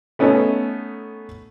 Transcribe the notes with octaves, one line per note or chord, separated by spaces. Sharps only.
A3 B3 C#4 D#4 A4